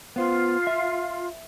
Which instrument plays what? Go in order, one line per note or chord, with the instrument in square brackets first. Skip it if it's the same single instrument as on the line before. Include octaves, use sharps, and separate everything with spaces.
[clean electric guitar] B3 C5 [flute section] F4 F5
[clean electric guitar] E5